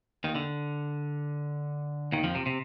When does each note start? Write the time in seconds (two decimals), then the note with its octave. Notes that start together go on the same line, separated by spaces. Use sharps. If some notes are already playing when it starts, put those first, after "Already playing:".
0.24 D#2 D#3
0.35 D3
2.12 D#2 D#3
2.24 F2 F3
2.35 C3
2.46 C3